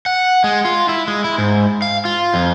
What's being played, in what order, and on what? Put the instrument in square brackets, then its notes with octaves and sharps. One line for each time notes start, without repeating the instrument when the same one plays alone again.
[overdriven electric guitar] F#5
G#3
F4
E4
G#3
E4
G#2
F5
F4
F2